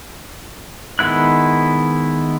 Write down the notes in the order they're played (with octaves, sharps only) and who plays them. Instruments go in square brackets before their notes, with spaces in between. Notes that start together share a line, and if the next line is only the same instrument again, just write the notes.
[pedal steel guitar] D#3 G#3 B3 E4 F#6